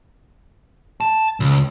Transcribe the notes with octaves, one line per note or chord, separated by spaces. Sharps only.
A5
C#2